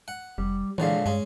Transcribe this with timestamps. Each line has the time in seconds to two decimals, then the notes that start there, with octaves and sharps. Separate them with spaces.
0.08 F#5
0.38 F1 G3
0.78 A#1 D3 E3 G#3 C#5 D5 F5
1.06 G2 G#3 C#4